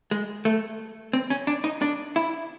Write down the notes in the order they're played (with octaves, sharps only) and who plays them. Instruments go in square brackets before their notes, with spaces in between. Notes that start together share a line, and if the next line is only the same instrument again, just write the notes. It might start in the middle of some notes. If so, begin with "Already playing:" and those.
[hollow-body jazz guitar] G#3
A3
C4
C#4
D4
D#4
D4
E4